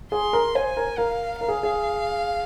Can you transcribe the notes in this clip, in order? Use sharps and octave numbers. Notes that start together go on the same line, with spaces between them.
G#4 C6
A#4
C5 G#5
A#4
A#4 F5
A#4 F5
G#4
G#4